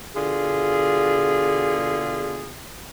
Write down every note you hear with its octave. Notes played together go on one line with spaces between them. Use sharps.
B2 D3 F4 G#4